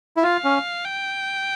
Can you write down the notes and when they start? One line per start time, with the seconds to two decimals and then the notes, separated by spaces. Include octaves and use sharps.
0.17 E4
0.23 F4 F5
0.44 C#4
0.85 G5